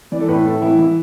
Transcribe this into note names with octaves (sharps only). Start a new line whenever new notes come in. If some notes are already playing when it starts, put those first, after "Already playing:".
E3 D5
A4
A2 B4
A2 A4
E3 E4
E3 E4